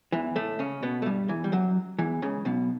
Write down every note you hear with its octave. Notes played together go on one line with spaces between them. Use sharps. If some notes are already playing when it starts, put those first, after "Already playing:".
E2 E3
A2 A3
C#3 C#4
B2 B3
A3
G2 G3
E2 E3
G3
F#2 F#3
E2 E3
C#2 C#3
B1 B2